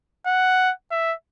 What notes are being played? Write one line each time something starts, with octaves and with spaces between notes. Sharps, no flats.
F#5
E5